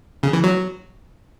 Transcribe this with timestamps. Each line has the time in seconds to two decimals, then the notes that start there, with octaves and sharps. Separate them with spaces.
0.23 C#3
0.33 E3
0.44 F#3